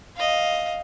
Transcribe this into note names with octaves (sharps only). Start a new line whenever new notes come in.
D#5 F5